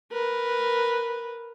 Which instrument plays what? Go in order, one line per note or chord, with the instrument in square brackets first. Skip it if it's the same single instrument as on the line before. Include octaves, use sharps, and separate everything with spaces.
[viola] A#4 B4